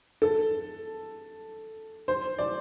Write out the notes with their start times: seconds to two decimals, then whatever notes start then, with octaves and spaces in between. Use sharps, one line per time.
0.22 A4
2.08 C5
2.38 D5